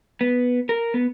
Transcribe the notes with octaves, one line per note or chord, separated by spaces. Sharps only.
B3
A#4
B3